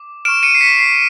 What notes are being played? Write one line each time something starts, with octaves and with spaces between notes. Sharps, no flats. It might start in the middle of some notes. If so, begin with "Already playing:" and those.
Already playing: D6
C#6 F6 D7 E7
C#7 D#7
C7
B6 C#7
C7